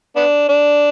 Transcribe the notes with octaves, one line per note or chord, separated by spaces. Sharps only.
B3 D4
D4